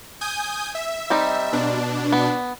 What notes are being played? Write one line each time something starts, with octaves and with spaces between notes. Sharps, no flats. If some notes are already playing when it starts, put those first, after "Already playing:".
G#5 D#6 G6
E5
G3 C4 D#4
B2 D4
B3